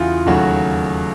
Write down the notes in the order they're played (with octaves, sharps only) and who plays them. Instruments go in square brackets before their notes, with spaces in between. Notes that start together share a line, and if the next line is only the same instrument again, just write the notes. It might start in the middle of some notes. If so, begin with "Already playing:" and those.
Already playing: [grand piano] E2 C#3 E3 F4 F#4
D#2 C#3 F#3 A3 F#4